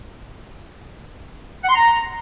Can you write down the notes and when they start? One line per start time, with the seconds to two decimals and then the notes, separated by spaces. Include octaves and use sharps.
1.63 F#5
1.69 C6
1.75 A#5